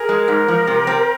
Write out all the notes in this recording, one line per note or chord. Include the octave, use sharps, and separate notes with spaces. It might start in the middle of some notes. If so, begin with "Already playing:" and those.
Already playing: G#4 A#4
G#3
G#2
F3
C3
C4